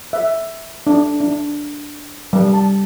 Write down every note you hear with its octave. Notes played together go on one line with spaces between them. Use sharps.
E5
D4
D4
G3
A5